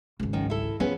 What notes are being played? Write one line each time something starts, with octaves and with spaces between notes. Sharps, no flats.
G#1 C#2
F#2 D#3
E4 A4
F3 B3 C#4 G#4